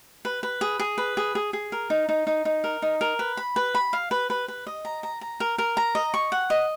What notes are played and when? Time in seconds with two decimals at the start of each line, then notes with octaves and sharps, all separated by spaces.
0.25 B4
0.43 B4
0.61 G#4
0.80 G#4
0.98 B4
1.17 G#4
1.35 G#4
1.53 G#4
1.72 A#4
1.90 D#4
2.09 D#4
2.27 D#4
2.45 D#4
2.64 A#4
2.82 D#4
3.01 A#4
3.19 B4
3.37 B5
3.56 B4
3.75 B5
3.93 F5
4.11 B4
4.30 B4
4.48 B4
4.67 D#5
4.85 A#5
5.03 A#5
5.21 A#5
5.40 A#4
5.58 A#4
5.77 A#5
5.95 D#5
6.14 C#6
6.32 F#5
6.50 D#5